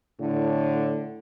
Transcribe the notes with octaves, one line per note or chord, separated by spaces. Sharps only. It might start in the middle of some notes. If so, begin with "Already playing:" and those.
A2 D3